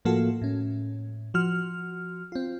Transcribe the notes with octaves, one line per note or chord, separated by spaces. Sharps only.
A2 F3 A#3 F4 F#4 A4
A2 C#4
F3 F#4 F6
C4 F4